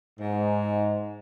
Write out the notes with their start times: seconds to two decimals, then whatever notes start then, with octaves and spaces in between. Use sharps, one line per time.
0.20 G#2